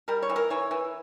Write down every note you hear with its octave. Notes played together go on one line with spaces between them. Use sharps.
G3 A#4
C#5
E3
A#4
E3 C#5
E3